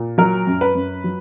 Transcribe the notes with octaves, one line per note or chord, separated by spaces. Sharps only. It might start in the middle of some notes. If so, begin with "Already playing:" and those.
Already playing: A#2
F#3 A#4
F#2
B4
F#2
F#3